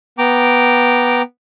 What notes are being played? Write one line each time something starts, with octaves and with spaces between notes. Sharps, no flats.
B3 G5 A#5 D6